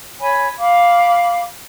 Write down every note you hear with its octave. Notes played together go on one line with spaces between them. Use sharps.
C#5 G#5 B5
F5 B5 D6